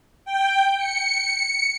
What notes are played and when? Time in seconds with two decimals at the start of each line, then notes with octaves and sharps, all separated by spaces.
0.25 G5
0.78 C#7